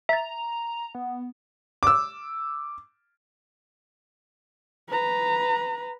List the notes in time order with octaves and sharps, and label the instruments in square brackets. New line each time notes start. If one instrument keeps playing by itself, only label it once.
[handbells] E5 A6 [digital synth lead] A#5
[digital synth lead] B3
[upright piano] D6 E6
[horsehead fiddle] B4 A#5